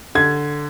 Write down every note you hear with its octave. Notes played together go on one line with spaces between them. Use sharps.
D3 G#6